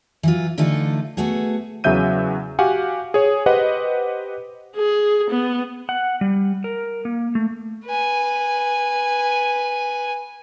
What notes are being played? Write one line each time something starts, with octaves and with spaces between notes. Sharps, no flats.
E3 F#3 F4
D3 E3 A3 D#4 F4 A4
A3 B3 F#4 G#4
E2 C#3 F#3 E5 G6 D#7
F#4 G4 F5 F#5 G#5
G#4 C#5
G4 B4 C5 D#5 F#5
G#4
B3
F#5
G3
A#4
A#3
A3
B4 G#5